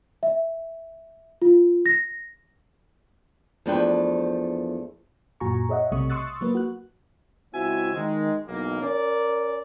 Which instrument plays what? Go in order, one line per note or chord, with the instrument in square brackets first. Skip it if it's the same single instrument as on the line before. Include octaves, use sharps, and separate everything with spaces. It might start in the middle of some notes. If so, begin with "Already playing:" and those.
[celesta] E5
F4
A#6
[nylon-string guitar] E2 F3 A3 D4 B4 G5
[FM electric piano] F#2 A#2 F#4 G#5 A#5 C#6
G#4 C#5 D#5 E5 F#5
B1 C3 G3 A3 C#6 D#6
C6 C#6 D#6 E6 F#6 A6
F#3 A#3 B4
F#4 F#6
[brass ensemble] C#2 C4 E4 F#4 E5 G#5
D#3 G#3
B1 E2 A#3
C#4 A#4 D5